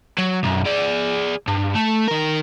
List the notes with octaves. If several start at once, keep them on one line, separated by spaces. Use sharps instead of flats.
F#3
B1 F#2
G#4 D5
G2
A3
D#3 A#4